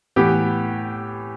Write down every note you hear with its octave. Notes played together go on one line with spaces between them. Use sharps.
A2 E3 B3 G4